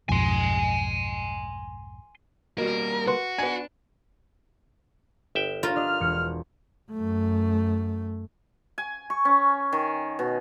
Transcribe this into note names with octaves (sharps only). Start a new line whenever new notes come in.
B1 F2 G#2 G#5 C6
B2 G3 A#3 A#4
F#4 B4 C6
B3 D4 G#5
G1 E5 G5
F4 A#4 C#5 F5
D4 D#5 F6
E1 C#7
F#2 A3
G#5
C#6
C#4
D#3
B2